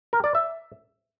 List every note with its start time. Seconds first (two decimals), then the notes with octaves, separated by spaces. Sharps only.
0.13 A#4
0.24 D5
0.35 E5